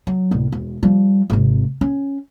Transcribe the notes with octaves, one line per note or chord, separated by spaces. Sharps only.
F#3
D1 C2
E1
F3 G3
G#1 C3
C#4